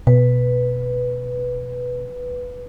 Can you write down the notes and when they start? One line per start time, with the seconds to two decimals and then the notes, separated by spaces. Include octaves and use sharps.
0.07 B2 B4